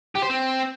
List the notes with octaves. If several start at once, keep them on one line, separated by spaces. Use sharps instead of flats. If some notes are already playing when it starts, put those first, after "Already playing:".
G4
C5
C4